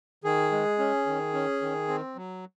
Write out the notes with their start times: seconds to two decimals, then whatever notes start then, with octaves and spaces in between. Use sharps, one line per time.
0.24 D#3 G#4
0.52 G#3
0.79 C#4
1.06 D#3
1.34 C#4
1.61 D#3
1.88 C4
2.16 F#3